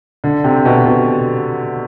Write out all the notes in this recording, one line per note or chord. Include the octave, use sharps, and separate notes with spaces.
D3
C3
B2
B2